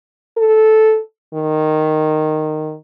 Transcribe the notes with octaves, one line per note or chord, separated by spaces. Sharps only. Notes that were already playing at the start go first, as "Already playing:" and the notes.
A4
D#3